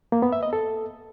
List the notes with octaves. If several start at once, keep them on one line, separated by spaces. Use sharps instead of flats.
A#3
B3
E5
D#5
A4